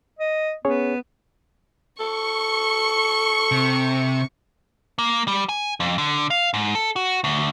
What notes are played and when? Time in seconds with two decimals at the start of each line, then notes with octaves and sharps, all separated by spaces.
0.19 D#5
0.65 B3 C#4 G#4 C#5
2.00 A4 C#6
3.52 C3
4.98 A#3
5.28 G3
5.49 G#5
5.80 F2
5.98 D3
6.30 F5
6.54 G#2
6.75 A4
6.96 F#4
7.24 D2